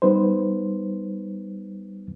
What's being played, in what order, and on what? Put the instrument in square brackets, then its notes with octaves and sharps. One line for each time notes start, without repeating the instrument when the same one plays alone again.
[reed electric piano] G3 B3 D#4 B4 C5